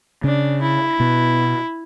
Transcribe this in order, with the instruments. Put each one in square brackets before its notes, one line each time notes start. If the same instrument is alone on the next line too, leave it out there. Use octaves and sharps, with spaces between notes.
[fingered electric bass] C#3 C#4 [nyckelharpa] D4
[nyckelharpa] E4
[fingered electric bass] B2 B3